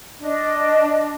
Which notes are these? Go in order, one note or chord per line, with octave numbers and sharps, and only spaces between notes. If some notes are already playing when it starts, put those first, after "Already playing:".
D4 D#5